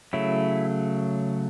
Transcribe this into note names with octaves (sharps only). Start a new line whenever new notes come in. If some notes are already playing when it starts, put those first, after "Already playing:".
C#3 F#3 A3 E4